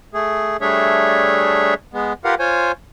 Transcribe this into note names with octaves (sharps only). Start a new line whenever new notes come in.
A3 G#4
G3 A3 D4 G#4 C#5 E5
G#3 B3
F4 G4 A#4 B4 F5 F#5
F4 C5 C#5 G#5